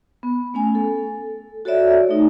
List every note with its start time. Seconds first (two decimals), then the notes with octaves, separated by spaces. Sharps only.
0.23 B3
0.54 A3 C#4 G#5
0.75 A4
1.65 F#4 A4 C#5 D5 E5
2.09 A3 D#4